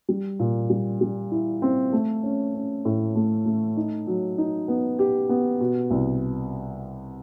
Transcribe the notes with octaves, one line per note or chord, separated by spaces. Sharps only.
G3
A#2
G3
G3
E4
C4
A3
C#4
C#4
A2
A3
A3
D#4
F#3
D#4
B3
G4
B3
B2
C2